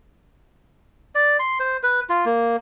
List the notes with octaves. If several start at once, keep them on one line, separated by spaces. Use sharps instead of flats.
D5
C6
C5
B4
F4
A#3